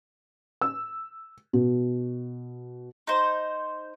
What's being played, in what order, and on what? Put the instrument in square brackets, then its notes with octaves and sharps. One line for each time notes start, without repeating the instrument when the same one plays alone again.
[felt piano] E6
B2
[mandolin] D#4 C5